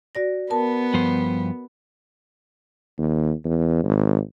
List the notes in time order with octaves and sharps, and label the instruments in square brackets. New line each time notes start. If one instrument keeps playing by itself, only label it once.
[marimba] F#4 D5 A#6
[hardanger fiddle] B3 [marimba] A#4 A5
[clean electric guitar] G2 F3 C5
[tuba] D#2
E2
G#1